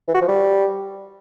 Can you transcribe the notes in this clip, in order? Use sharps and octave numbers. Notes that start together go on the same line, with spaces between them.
E3
F#4
F3
G3